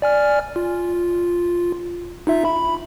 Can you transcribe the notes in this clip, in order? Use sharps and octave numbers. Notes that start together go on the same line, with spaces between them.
D5 G#5 F6
F4
D#4 F4 E5
B5